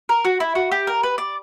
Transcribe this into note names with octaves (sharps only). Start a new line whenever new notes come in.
A#4
F#4
E4
F#4
G4
A#4
B4
D5